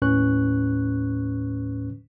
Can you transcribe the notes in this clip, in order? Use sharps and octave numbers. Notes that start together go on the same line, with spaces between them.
D#2 A2 C#4 B4 C#6 F#6